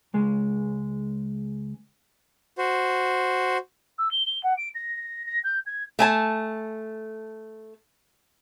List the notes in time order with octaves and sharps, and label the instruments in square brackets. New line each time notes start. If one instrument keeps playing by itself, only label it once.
[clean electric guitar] C#2 G#3
[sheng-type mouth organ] F#4 C5
[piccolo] E6
G7
G7
F#5
D7
A#6
A#6
G6
G#6
[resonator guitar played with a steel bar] A3 G#5 A5